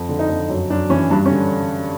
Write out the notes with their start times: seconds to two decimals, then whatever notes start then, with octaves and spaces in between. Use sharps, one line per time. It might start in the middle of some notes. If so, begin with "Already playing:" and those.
Already playing: F2
0.09 D3
0.19 D#4
0.29 F2
0.49 F#2
0.70 F#2 D4
0.90 E3 C#4
1.10 G2 D4
1.26 C#4
1.30 D3